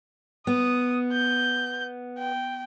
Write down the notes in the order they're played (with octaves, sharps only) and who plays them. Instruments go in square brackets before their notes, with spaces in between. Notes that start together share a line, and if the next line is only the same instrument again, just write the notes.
[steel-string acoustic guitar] B3 [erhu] D#6
[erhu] G6
G5